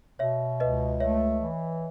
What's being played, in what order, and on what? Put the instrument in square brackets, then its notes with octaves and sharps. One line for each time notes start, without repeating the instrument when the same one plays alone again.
[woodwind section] B2 [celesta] C#5 E5
[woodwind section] C#2 [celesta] B4 D#5
[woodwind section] A3 [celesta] C#5 E5
[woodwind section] E3